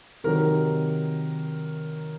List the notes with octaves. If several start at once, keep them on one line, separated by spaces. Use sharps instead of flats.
C3 D#3 F#3 A#4